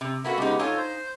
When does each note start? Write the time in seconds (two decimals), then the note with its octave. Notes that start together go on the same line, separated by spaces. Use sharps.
0.01 C3
0.25 A#3 B3 F#4 A4 E5
0.38 C#3 G#3 B3 D#4 G4
0.59 D#4 F4 A4 C#5 F5 G#5
0.78 C5